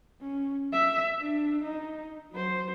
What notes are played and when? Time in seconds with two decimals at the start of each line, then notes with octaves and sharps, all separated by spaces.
0.21 C#4
0.73 E5
1.21 D4
1.64 D#4
2.32 F#3 C5